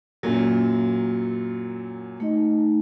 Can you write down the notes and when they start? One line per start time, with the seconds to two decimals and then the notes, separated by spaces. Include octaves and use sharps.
0.23 F#2 A#2 F#3
2.20 A3 D#4 D#5